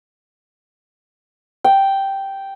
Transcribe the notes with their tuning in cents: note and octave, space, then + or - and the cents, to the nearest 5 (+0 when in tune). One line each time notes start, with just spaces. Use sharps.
G5 -5